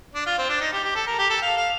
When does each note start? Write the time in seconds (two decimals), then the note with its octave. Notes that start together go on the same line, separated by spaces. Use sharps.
0.15 D4
0.27 F4
0.38 C4
0.49 D4
0.61 D#4
0.73 G4
0.84 G4
0.96 A4
1.07 A#4
1.19 G4
1.30 A4
1.42 F5
1.58 F5